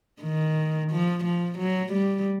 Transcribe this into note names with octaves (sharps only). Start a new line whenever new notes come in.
D#3
F3
F3
F#3
G3